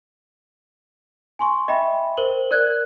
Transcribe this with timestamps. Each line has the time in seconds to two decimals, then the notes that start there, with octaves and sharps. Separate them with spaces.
1.39 G#5 C6 C#6
1.68 D#5 E5 G5 B5
2.17 A#4 C5 F#7 G7
2.51 A#4 D5 F#6 G#6